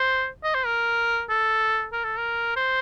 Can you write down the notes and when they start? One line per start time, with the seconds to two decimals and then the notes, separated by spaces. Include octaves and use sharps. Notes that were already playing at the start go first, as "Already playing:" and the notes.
Already playing: C5
0.44 D#5
0.55 C5
0.66 A#4
1.29 A4
1.93 A#4
2.04 A4
2.17 A#4
2.56 C5